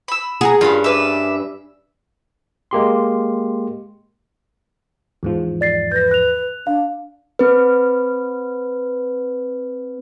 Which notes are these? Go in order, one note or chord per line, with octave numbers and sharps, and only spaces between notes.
B5 E6
G#4 F#5 G#5 A#5
G2 C#4 F4 A#4 B5
B4 D5 E5
G#3 A#3 G4 C6
E2 G#2 F3
D5 A6 C7
B4 G6 A#6
F#6 F7
D4 F5
C4 B4